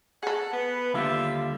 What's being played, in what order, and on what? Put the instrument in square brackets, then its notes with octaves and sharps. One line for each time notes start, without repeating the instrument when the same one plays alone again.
[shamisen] G#4 A4 [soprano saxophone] F#5
[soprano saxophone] B3 [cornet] B4
[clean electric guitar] D#2 D3 G3 [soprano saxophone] F4 [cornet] E5